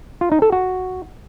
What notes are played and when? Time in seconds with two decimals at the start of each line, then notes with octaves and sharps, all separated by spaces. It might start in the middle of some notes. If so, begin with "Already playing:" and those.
0.21 F4
0.32 D#4
0.42 A4
0.52 F#4